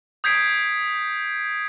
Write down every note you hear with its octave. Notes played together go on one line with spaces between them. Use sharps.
D#6 G6 G#6 B6 C7 D7